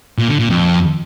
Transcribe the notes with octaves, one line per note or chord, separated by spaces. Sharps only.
A#2
D3
A#2
F2